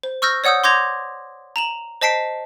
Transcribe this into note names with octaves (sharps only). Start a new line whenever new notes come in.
C5
C#6 E6 F6 G6 A#6
C#5 D5 F#5 D#6 E6 G6
C6 D6 G6 G#6 A#6 F7
A#5 E7 F#7
C5 D#5 A5 B6 C7 D7